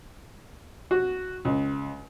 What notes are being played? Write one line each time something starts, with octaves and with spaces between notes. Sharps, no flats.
F#4
C#2